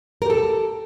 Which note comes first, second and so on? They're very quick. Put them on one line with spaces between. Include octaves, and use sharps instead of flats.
A#4 G4 A4